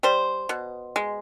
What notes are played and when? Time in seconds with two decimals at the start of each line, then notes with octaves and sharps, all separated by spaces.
0.03 G3 C5
0.49 B2
0.96 G#3